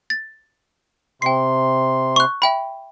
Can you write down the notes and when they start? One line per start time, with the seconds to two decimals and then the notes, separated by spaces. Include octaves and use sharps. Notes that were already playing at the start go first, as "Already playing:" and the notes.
0.10 A6
1.22 C3 G5 C6 C7
2.16 C#6 F#6
2.42 E5 G5 B5